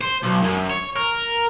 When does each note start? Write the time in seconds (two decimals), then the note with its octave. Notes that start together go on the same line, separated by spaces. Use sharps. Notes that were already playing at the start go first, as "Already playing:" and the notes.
0.01 C5
0.23 B1
0.43 F#2
0.70 C#5
0.96 A#4